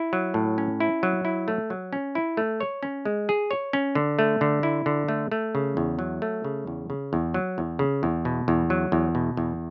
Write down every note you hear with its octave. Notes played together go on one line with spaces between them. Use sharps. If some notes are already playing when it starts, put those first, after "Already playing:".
Already playing: E4
F#3
A2
C#4
E4
F#3
E4
A3
F#3
C#4
E4
A3
C#5
C#4
G#3
G#4
C#5
C#4
D3
A3
D3
E4
D3
A3
A3
C#3
E2
F#3
A3
C#3
E2
C#3
E2
F#3
E2
C#3
E2
B2
E2
F#3
E2
B2
E2